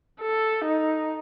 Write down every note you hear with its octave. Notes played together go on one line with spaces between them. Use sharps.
A4
D#4